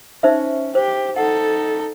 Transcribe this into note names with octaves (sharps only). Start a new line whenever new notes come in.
C#4 D#4 C5 E5
G4 C5
D#4 A4 F#5